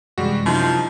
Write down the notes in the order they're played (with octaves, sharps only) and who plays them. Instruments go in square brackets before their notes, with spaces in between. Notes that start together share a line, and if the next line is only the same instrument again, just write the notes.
[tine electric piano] F#2 C3 E3 [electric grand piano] G3 G#3 F#4
[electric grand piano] F#2 D#4 [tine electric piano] C3 E4 [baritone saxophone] F3